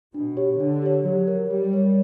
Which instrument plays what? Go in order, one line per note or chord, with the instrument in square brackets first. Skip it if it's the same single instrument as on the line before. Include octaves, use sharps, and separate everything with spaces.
[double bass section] B2 [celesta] D4
[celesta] G4 C#5
[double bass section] D3 [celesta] D4
[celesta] G4 C#5
[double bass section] F#3 [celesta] G4
[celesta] A#4 C#5
[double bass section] G3 [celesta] G4
[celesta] A#4 C#5